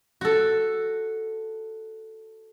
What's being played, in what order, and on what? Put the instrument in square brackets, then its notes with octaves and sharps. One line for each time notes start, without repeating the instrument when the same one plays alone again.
[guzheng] F#4 A4